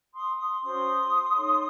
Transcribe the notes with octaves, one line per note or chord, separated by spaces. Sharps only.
C6 D#6
C6 D#6
C#4 F#4 C5 C6 D#6
D#4 A4 C#5